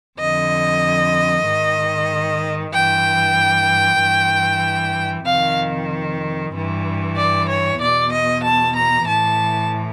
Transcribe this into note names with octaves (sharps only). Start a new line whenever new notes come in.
F2 D3 D#5
G#2 D#3
G2 E3 G5
G2 E3
F2 C3 D#3 F5
G2 E3
D5
C#5
E2 B2 D5
D#5
A5
A#5
A2 E3 A5